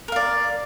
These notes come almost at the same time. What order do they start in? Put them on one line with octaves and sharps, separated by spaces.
A#4 F5 D5